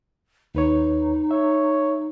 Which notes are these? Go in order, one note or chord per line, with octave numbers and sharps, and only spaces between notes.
D#2 D#4 B4 C#5
C#5 E5